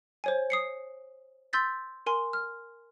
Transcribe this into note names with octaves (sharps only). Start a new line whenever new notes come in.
C5 C#5 G#5
D#6 C7 C#7
C6 E6 G6 A6 B6
A#4 G#5 C6
F6